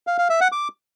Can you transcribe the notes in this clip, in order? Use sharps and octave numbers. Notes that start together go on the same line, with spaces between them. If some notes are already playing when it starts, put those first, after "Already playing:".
F5
F5
E5
F#5
D6